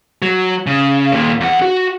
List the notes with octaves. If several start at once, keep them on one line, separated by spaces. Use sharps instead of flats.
F#3
C#3
D#2 A#2
E2 F#5
F#4